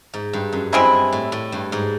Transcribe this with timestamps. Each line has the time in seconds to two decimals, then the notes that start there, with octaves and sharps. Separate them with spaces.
0.14 G#2
0.33 G2
0.53 F#2
0.72 G2 G#3 C4 E4
1.13 A2
1.32 A2
1.52 G2
1.72 G#2